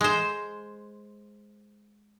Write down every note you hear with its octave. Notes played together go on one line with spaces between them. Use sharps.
G#3 C5